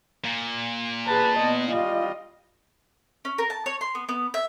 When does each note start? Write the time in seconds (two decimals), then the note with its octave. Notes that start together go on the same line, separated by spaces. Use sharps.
0.24 A#2
1.07 G#4 B4 A5
1.38 B3 D#5
1.72 G3 F4 D#5
3.25 C#4
3.38 A#4
3.50 A5
3.66 C#5
3.81 C6
3.95 B3
4.09 B3
4.34 E5